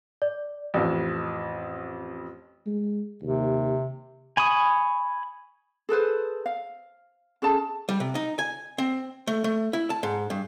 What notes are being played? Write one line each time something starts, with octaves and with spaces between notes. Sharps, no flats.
D5
A1 F2
G#3
D#2 C3
G#5 B5 C#6 D#6
G#4 A4 B4 C5
F5
C#4 G#4 A4 A5
G3
C3
D#4
G#5
C4
A3
A3
E4
A5
G#2
G2